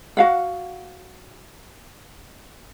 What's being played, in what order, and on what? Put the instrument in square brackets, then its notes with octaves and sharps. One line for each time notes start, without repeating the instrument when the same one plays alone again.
[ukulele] F#4 F5 F#5